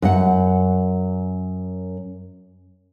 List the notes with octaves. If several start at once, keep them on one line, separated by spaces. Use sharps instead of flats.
F#2 F#5